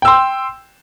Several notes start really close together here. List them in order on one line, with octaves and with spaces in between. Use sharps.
G5 E6 C6